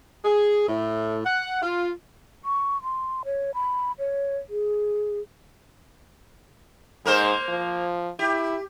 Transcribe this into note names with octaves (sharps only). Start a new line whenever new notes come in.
G#4
A2
F#5
F4
C#6
C6
C#5
B5
C#5
G#4
G#2 A#3 A#4 C5
F3
E4 G4